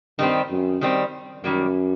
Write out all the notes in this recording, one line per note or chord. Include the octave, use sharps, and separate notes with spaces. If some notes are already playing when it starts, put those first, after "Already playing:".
G2 D#3 G3 C4
F#2
D#3 G3 C4
F#2 D#3 G3 A#3